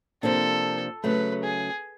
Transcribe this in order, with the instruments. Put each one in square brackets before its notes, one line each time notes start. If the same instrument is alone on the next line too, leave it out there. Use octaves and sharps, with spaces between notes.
[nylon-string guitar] C3 F3 A#3 D4 [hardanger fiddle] A4
[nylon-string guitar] C#3 F#3 A3 [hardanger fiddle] B4
[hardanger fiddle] G#4